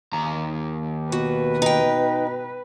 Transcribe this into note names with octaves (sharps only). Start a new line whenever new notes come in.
D#2 A#5
B2 F#4 B4
D#4 G5